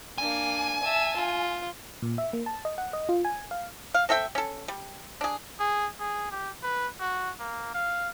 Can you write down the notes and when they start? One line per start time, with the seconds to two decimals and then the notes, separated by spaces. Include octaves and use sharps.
0.18 A#3 D4 G#5
0.82 E5 A5
1.16 F4
2.02 A#2
2.18 E5
2.33 A#3
2.46 A5
2.65 D#5
2.78 F#5
2.93 D#5
3.09 F4
3.25 G#5
3.51 F5
3.94 F5
4.09 C4 A4 E5 G5
4.35 C#4 A4
4.68 G3
5.21 D4 G#4
5.60 G#4
6.00 G#4
6.31 G4
6.63 B4
7.00 F#4
7.40 A#3
7.74 F5